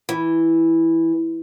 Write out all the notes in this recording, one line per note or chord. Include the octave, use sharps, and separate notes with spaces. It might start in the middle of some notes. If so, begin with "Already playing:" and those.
E3